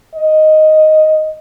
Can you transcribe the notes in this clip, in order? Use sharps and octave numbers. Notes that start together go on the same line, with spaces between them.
D#5